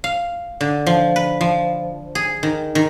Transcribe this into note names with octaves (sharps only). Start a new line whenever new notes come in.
F5
D3
F3
B4
F3
G#4
D#3
D#3